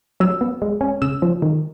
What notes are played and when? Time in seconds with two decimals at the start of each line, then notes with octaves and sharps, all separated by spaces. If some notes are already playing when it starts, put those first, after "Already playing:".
0.20 F#3 E6
0.41 B3
0.62 G#3
0.81 C#4
1.02 C#3 E6
1.22 F3
1.42 D#3